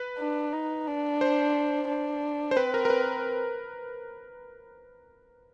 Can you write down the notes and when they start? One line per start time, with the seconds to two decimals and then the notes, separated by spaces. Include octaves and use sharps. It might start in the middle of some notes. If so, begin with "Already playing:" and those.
Already playing: B4
0.19 D4
0.53 D#4
0.87 D4
1.21 C5
1.89 D4
2.51 C5
2.56 C4 B4
2.74 A#4
2.85 A#4
2.90 B4